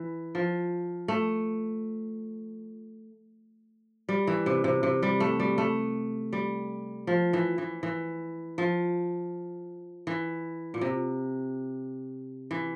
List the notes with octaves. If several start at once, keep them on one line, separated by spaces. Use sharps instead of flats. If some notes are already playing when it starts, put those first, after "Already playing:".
Already playing: E3
F3
A3
G3
E3
C3
C3
C3
G3
A3
G3
A3
G3
F3
E3
E3
E3
F3
E3
A#2
C3
E3